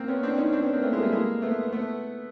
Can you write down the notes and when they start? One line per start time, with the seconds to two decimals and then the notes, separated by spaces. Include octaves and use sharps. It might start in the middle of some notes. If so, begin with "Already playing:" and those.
Already playing: A#3 C4
0.08 B3 C#4
0.23 C4 D4
0.38 C#4 D#4
0.52 C4 D4
0.63 B3 C#4
0.73 A#3 C4
0.82 A3 B3
0.93 G#3 A#3
1.02 G3 A3
1.12 G#3 A#3
1.42 A3 B3
1.72 A3 B3